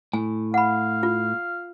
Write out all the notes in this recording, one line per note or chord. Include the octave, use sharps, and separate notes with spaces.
A2 G#5
F5 F#5 B5
F4